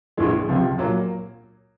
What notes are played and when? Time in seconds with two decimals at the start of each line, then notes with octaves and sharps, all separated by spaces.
0.17 A#1 A2 E3 G#3
0.48 C#2 C3 F3
0.78 A#2 F#3 A#3